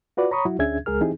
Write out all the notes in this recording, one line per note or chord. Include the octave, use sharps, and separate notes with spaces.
F4 F#4 B4 D5
C#5 A#5 B5 C#6 D#6
F#3 E4 F#4
D2 C#4 D4 G#4 E5 G#6
C#2 G#3 G#4 A#4 F6
E3 C4 D#4 E4 G4 G#4